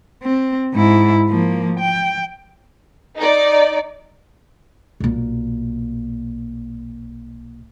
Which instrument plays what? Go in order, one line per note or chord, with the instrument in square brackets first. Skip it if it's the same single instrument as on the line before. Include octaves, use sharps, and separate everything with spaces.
[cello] C4
G#2 E4
F3 A#3
G5
[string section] D#4 D5
[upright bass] B1 A#2